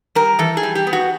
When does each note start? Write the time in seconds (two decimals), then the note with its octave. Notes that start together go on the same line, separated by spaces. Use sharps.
0.15 G3 A#4
0.39 E3 A4
0.57 G#4
0.63 G3
0.75 G4
0.87 B3
0.93 F#4